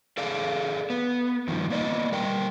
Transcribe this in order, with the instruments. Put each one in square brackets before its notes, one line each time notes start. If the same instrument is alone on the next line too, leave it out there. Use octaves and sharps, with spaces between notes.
[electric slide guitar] G#4 A4 D5 F5
B3
E2 G2 D#3 F3
A#3 B3 D5 D#5
G3 A#4 G5